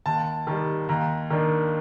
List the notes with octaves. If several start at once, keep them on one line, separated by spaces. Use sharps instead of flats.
D#2 A5
D#3 G3
D#2 A#5
D#3 A#3 D4